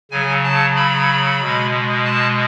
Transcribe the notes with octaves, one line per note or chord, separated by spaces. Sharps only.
C#3 F#3 G#5
A5
B5
B2 G#3
A5